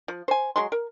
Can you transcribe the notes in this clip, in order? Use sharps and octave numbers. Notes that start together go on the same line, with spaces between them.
F3
C5 G#5
F#3 G#3 C6
A#4